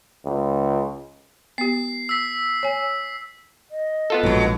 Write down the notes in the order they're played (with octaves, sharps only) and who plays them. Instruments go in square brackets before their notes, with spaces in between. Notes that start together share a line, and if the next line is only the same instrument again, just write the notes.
[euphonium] C#2
[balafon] B3 G4 [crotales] C7
[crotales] E6 B6
[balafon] C#5 G#5
[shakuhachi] D#5
[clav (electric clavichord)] B3 F4 A4
[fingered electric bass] A#1 G#2 [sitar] B2 F#3